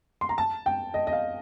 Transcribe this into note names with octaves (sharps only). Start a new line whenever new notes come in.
C6
A#5
A5
G5
D#5
D#5
F5